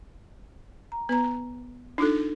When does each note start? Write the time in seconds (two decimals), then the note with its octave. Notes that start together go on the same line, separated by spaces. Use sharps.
0.92 A#5
1.09 B3 B4 A#5
1.98 D4 D#4 F4 A4